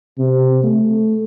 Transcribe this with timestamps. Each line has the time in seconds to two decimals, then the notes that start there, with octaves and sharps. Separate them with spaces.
0.19 C3
0.63 A3